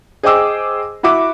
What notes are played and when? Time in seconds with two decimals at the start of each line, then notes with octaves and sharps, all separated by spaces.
0.23 G#4 C5 D#5 G5 D6 E6
1.03 E4 F#4 E5 D6